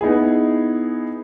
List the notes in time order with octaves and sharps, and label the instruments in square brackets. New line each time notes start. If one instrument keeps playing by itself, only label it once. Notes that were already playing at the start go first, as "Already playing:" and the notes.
[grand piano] B3 D#4 E4 G#4